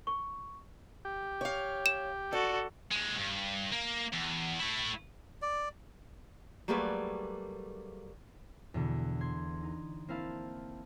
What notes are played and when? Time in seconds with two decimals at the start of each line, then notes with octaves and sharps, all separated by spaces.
0.07 C#6
1.05 G4
1.41 C#5 F5
1.86 E7
2.33 F#4 A4 D5
2.92 D#2 G#3
3.18 G2
3.72 A#3
4.13 E2
4.59 A3 E4
5.42 D5
6.68 F#3 G3 A3 A#3 G#4 B4
8.74 E2 B2 D3
9.21 C6 G#6
9.63 D#4
10.08 A#3 C4 E4 F5 A5